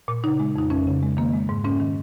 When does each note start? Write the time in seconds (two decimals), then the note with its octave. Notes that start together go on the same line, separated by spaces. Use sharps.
0.08 A#2
0.24 C#3 D#4
0.39 G#3
0.56 F2 D#4
0.70 F2 C#4
0.87 C#3
1.03 G#3
1.17 D#3 A#3
1.33 G#3
1.49 G#2
1.64 G#2 C#4
1.80 D#3